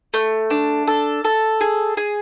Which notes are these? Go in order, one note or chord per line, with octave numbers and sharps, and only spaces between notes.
A3
D4
A4
A4
G#4
G#4